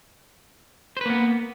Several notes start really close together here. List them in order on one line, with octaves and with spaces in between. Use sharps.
C5 B4 A#3 B3